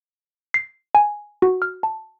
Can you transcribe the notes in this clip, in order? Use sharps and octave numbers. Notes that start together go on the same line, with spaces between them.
C7
G#5
F#4
F6
A5